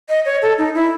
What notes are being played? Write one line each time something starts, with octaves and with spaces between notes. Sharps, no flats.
D#5
C#5
A4
D#4
E4